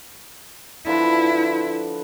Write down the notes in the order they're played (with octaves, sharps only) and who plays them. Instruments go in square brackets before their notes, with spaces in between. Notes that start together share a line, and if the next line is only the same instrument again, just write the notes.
[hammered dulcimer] D3 F3 B4 [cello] E4